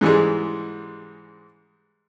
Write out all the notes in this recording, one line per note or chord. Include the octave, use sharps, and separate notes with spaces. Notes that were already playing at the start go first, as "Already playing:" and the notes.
G#2 E3 G3 G#3